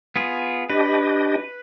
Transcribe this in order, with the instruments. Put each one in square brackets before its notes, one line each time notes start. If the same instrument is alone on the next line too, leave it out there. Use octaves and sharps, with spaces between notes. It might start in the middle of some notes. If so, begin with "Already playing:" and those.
[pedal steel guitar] B3 F4 G#4
[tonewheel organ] D4 G4 D#5 [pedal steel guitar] B4